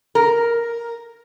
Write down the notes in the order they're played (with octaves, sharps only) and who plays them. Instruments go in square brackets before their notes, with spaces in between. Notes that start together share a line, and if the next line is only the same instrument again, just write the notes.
[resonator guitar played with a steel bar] A#4